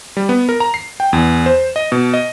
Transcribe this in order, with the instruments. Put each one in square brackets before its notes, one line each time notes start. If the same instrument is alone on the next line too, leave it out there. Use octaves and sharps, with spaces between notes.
[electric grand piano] G3
B3
A#4
A#5
C7
G5
E2
C5
D#5
B2
D#5